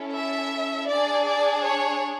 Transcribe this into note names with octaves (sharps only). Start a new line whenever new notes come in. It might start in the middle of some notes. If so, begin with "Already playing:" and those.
Already playing: C#4 E4 A4
E5
D4 G#4 D5
D5
C#5